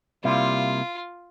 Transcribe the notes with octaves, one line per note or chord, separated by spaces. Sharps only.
C3 G3 A#3 E4 F4